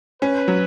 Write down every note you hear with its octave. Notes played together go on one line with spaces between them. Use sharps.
C#4 B4
F#3